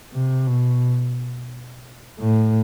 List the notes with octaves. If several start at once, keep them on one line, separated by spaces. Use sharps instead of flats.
C3
B2
A2